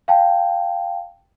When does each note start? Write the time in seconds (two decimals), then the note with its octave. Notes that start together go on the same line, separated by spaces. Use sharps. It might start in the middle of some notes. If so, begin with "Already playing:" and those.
0.08 F5 G5 A5